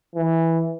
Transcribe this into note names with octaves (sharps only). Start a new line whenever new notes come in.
E3